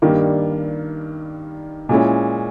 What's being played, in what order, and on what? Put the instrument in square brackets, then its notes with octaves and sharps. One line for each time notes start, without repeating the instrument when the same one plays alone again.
[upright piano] G2 D#3 G3 A#3
A#2 G#3 C#4 E4